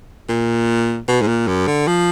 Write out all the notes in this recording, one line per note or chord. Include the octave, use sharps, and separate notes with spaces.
A#2
B2
G#2
A#2
F#2
D3
F3